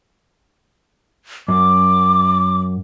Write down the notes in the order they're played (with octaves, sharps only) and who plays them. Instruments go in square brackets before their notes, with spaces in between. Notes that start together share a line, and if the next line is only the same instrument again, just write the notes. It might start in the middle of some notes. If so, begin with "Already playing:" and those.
[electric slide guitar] F#2 [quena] D6